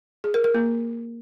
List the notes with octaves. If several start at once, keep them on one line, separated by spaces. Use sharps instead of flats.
G#4
A#4
A#4
A#3